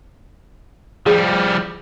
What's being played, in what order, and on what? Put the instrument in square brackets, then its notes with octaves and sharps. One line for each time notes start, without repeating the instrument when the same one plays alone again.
[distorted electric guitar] F3 G3 [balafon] G#4